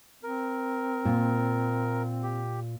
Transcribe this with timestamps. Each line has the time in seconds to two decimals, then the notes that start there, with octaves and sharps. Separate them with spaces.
0.23 C4 A#4
1.05 A#2
2.23 G4